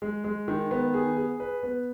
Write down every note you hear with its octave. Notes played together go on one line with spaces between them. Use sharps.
G#3
G#3
D#3
B3
G#4
G#4
B4
B3